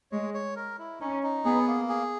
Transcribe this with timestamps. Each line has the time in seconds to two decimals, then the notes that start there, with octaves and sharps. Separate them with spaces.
0.12 G#3 C#5
0.34 C#5
0.56 A#4
0.79 E4
1.00 C#4 D#4
1.23 D#4
1.45 B3 G#4
1.67 A#3
1.89 G#4